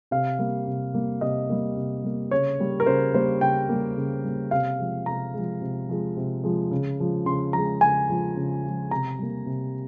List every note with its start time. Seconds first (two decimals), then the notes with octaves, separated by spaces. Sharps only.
0.11 C3 F5
0.39 G3 A#3
0.67 C3
0.94 G3 A#3
1.21 C3 D#5
1.49 G3 A#3
1.76 C3
2.04 G3 A#3
2.31 C#3 C#5
2.59 G3 A#3
2.80 A#4
2.86 C#3 C5
3.14 G3 A#3 C5
3.41 C#3 G5
3.69 G3 A#3
3.97 C#3
4.24 G3 A#3
4.51 C3 F5
4.79 F3 G#3
5.06 C3 A#5
5.34 F3 G#3
5.61 C3
5.89 F3 G#3
6.17 C3
6.44 F3 G#3
6.71 C#3
6.99 F3 G#3
7.26 C#3 C6
7.53 F3 G#3 A#5
7.81 C#3 G#5
8.09 F3 G#3
8.36 C#3
8.63 F3 G#3
8.91 C3 A#5
9.19 G3 A#3
9.46 C3